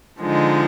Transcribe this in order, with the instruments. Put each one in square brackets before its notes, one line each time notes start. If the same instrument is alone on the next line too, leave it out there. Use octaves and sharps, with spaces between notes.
[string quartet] D3 F3 G#3 D#4